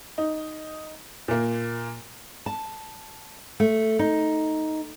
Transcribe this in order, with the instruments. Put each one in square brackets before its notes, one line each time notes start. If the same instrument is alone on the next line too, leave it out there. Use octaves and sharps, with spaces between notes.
[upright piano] D#4
A#2 A#3
[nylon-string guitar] A5
A3
D#4